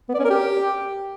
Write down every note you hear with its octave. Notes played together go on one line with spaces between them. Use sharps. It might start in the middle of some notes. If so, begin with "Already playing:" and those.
B3
D5
C#4
A#4
G4